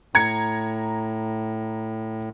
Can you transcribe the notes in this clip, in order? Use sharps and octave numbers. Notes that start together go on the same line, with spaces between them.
A2 A#5 G#6 C#7